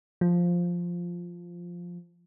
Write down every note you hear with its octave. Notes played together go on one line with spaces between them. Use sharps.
F3